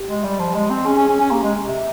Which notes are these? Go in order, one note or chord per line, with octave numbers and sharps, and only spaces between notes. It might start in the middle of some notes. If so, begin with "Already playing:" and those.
Already playing: G4
G#3
G3
F3
G#3
C4
C#4 G#4
C#4
C#4
C#4
A#3 G4
G#3
C3